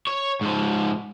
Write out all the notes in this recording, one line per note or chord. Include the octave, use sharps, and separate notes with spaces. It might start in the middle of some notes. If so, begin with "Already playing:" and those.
C#5
G#2 F3